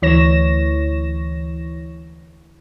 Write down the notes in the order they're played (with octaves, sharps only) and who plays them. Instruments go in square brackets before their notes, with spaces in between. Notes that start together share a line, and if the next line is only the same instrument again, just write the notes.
[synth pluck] D2 E3 C#5 A#6 E7